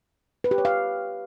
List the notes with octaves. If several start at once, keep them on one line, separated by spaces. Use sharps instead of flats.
B4
G4
C#5
F5